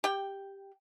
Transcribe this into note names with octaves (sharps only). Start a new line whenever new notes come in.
G4 G5